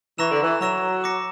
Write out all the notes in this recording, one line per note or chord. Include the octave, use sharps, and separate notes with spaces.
E3 A#5 C#6 E6 A#6 E7
D3
E3
F#3 A#5 C#6 E6 A#6 E7
D6 A#6 C#7